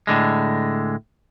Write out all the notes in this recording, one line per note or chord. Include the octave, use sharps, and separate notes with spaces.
A2 D3 G#3